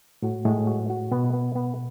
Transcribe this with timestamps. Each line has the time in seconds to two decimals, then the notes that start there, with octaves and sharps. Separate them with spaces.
0.22 A2 F#4
0.45 A2 G#3
0.67 F#4
0.90 F#4
1.12 B2 B3
1.33 B3
1.55 B3